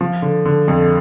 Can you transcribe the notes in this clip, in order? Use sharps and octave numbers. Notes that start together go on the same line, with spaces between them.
F3
D3
D3
F2